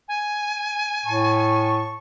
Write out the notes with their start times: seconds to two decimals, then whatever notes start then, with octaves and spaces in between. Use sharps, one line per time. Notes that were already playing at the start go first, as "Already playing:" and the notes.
0.08 G#5
1.06 A2 A5 C#6